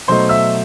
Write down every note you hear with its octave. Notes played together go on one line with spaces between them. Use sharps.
B2 F#3 A3 D#4 C5 C6
E5 E6